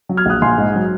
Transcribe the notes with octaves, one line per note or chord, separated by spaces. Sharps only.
F#3
F6 G#6
A#1 D#6 F#6
A#1 G#5 C6
G#2
F#3